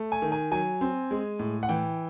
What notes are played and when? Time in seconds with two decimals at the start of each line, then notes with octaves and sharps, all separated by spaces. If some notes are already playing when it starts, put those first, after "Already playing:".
Already playing: A3
0.12 G#5
0.22 D#3
0.32 G#5
0.51 F#3 G#5
0.81 C4
1.11 G#3
1.39 A2
1.63 F#5
1.69 E3 G5